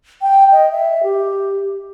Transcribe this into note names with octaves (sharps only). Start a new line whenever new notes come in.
G5
D#5
E5
G4